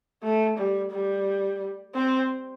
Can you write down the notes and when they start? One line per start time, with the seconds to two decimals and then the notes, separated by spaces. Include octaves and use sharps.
0.23 A3
0.57 G3
0.92 G3
1.95 C4